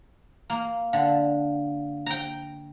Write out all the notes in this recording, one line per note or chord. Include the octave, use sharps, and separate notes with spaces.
A#3
D3 F5 F#5
G5 A#5